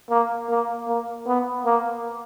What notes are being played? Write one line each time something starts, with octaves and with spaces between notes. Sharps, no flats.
A#3
A#3
A#3
B3
A#3